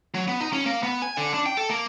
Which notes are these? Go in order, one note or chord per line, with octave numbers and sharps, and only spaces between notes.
F#3
B3
D#4
C#4
A#3
B3
G#5
D3
D4
G5
A4
A#3